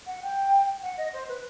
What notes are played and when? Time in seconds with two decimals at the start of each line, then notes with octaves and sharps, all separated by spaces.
0.07 F#5
0.22 G5
0.83 F#5
0.97 D#5
1.13 C5
1.28 B4